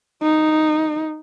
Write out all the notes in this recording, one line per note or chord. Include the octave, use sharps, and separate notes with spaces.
D#4